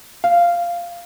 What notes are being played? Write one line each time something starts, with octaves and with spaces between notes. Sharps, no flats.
F5